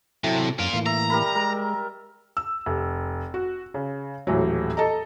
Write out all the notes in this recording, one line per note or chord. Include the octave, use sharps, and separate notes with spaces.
C3 F#3 E4 A4
F#2 F4 A#4
A2 E3 A#3
E5 A#5
G3 A#4 B5
G#3 A#4
E6
F1
F#4
C#3
D#1 A2 E3 F#3
A4 D#5 A#5